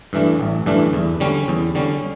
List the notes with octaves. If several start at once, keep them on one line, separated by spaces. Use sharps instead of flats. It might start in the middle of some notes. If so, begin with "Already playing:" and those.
G2 E3 A3 D4
A1
G2 E3 A3 D4
E2
D3 G3 C#4
E2
D3 G3 C#4